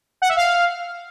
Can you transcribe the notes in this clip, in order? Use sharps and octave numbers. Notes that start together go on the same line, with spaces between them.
F#5
E5
F5